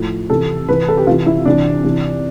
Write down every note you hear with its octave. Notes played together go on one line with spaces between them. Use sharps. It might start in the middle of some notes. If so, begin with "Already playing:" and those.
Already playing: A2 F3
C3 E3 A4
C3 E3 B4
A4
G4
C3 E3 F4
E4
C3 E3 D4
C3 E3